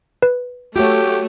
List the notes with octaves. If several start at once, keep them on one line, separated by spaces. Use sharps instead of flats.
B4
A3 F#4 G4 C#5